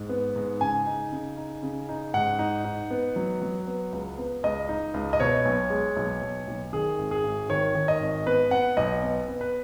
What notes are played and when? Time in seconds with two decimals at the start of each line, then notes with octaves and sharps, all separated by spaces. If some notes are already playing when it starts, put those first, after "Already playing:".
Already playing: G#2
0.09 B3
0.36 G#2
0.61 C#3 G#5
0.86 D#4
1.12 C#3
1.37 D#4
1.63 C#3
1.89 D#4
2.14 G#2 F#5
2.39 D#4
2.64 D#4
2.91 B3
3.16 F#3
3.42 F#3
3.67 B3
3.93 C#2
4.18 B3
4.44 C#2 D#5
4.69 D#4
4.94 C#2
5.13 D#5
5.20 B2 C#5
5.45 B1
5.70 G#3
5.97 B1
6.22 B1
6.48 B1
6.73 D#3 G#4
6.99 G#1
7.11 G#4
7.24 G#1
7.49 D#3 C#5
7.75 D#3
7.88 D#5
8.00 G#1
8.26 B3 B4
8.51 B3 F#5
8.77 B1 D#5
9.03 B3
9.28 B3
9.41 B4